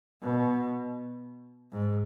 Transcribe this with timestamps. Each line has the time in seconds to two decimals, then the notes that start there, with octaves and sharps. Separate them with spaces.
0.22 B2
1.72 G#2